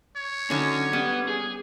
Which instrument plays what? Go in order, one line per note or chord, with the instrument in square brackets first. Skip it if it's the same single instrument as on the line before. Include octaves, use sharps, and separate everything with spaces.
[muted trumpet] C#5
[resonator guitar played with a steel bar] D3 F#3 D#4 [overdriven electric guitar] C#4
[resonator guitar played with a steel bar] G3 [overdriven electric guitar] B3
[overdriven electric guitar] G#4